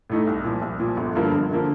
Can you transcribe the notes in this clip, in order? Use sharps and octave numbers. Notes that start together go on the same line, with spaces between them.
A2 A3 D#4
C2
A#2 F3
C2
A#2 F3
G1
G2 D3 F3 A#3
G1
D3 F3 A#3